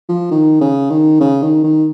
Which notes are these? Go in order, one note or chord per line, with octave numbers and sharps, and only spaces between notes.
F3
D#3
C#3
D#3
C#3
D#3
D#3